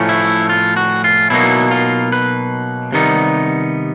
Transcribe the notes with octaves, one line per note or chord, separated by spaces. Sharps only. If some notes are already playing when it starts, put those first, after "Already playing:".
Already playing: A2 F3 A3 C#4
E4
F4
F#4
F4
B2 F#3 A#3 D#4 E4
F4
B4
C3 D#3 G3 B3 D#4